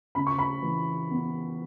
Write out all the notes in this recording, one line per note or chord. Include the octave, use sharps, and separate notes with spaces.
C#3 B5
C#6
B5
E3
B3